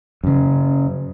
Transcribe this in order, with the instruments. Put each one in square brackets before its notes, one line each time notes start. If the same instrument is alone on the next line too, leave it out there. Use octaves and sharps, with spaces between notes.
[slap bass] F#2 C#3